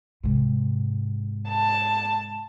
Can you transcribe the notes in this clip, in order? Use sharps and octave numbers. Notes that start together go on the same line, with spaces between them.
G#2 C3
A5